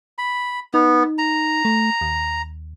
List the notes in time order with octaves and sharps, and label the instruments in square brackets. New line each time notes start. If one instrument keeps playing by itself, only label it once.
[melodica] B5
[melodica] B3 [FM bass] D#4
[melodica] A#5
[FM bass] A3
D#2